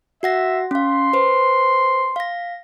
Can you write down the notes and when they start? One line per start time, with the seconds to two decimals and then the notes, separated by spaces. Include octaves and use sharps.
0.23 F#4 E5 F#5 A#6
0.71 C#4 F5 C6
1.13 B4 C5
2.16 F5 A#6